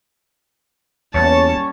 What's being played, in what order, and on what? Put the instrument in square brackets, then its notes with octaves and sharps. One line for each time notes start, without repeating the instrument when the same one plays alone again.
[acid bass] E2 [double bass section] G3 A#3 C#4 [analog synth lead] C#5 [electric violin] A5